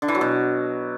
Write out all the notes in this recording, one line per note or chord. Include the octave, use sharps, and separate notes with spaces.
D3
E3
F#3
B2